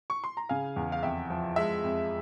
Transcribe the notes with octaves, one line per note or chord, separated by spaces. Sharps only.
C#6
C6
A#5
C#3 F5 G#5
E2
F5
F2 E5 G5
F3
G#3 E5
F2